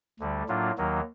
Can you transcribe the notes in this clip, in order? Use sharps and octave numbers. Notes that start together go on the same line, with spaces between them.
D2 D3 G3
A2 F#3 A#3 D4 F4
D#2 D#3 F#3 A#3 D#4